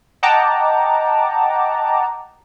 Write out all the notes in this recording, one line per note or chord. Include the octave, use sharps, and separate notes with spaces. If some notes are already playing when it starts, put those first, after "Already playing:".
D#5 F#5 G5 A5 A#5 D6